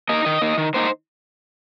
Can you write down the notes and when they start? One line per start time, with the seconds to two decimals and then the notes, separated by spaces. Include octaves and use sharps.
0.09 A#3 D#4 D#5
0.25 D#3 D#5
0.42 A#3 D#4
0.58 D#3
0.74 A#3 D#4 C5